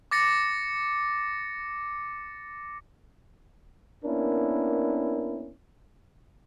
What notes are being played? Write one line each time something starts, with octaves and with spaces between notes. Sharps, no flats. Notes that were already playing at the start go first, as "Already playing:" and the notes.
D6 A6 A#6 C#7
A#3 B3 C#4 D4 E4 A#4